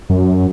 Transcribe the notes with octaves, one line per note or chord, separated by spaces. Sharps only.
F#2